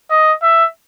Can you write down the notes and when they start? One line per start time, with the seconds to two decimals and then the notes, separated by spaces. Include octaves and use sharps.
0.10 D#5
0.43 E5